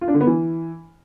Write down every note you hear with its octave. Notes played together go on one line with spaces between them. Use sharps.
F4
D4
D3
B3
E3